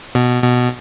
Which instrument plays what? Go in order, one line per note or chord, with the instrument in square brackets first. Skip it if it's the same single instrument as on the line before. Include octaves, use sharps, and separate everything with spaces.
[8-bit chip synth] B2
B2